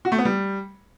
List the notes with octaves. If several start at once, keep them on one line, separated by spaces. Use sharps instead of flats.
F#4
A3
B3
G3